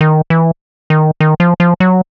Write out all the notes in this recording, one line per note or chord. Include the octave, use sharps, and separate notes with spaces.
D#3
E3
D#3
D#3
F3
F3
F#3